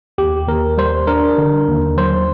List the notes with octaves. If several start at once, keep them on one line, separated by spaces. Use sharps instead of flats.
D#2 G4
D#2 A#4
G3 C5
D4 A#4
D3
D#2
F#3 C5